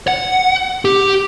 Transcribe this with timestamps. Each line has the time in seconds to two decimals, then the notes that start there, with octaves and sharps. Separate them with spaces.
0.08 F#5
0.85 G4